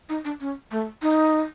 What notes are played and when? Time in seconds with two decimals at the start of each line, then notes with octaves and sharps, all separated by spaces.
0.09 D#4
0.25 D4
0.41 C#4
0.71 A3
1.02 D#4